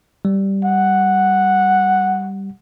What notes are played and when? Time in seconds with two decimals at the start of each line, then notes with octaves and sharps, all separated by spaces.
0.25 G3
0.65 F#5